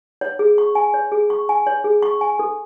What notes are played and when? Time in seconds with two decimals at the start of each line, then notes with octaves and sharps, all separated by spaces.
0.21 C#5
0.39 G#4
0.58 C#6
0.75 G#5
0.94 C#5
1.12 G#4
1.30 C#6
1.49 G#5
1.67 C#5
1.84 G#4
2.02 C#6
2.21 G#5
2.39 A4